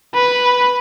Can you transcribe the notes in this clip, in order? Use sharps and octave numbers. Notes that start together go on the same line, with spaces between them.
B4